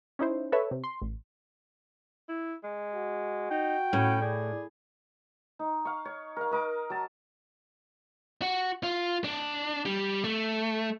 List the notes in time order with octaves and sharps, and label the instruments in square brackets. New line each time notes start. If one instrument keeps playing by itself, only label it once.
[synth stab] C#4 D#4 E4 C5
A4 B4 C#5 E5
C3
C6
A1
[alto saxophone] E4
G#3
[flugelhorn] F#4
[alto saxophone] D#4 [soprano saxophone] G5
[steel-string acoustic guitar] A2 [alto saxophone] C#4
[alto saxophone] G#4 [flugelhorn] D5
[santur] D#4
F5 C#6
C#5
A#4 F5
A#4 D#5 D6
F#3 A5
[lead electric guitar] F#4
F4
D4
G3
A3